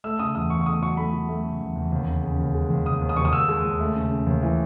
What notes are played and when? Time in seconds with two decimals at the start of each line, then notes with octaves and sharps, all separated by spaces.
0.04 A3 E6
0.19 C#3 D#6
0.35 E2 D#6
0.50 E2 C#6
0.61 C#6
0.66 A3 D#6
0.82 F#3 C#6
0.97 A3 B5
1.14 F#3
1.29 A3
1.45 C#3
1.61 E2
1.76 E2
1.92 D#2
2.08 C#3
2.23 C#3
2.39 D#2
2.54 G#3
2.70 D#2
2.86 D#2 D#6
3.01 D#2
3.09 D#6
3.17 D#2 C#6
3.25 D#6
3.33 D#2 E6
3.49 G#3
3.65 D#2
3.80 A3
3.96 C#3
4.11 C#3
4.26 D#2
4.43 E3